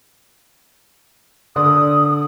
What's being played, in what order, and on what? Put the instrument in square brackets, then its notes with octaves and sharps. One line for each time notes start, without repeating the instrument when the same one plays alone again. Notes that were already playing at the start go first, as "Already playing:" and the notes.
[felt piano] D3 D5 C6 [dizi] D#6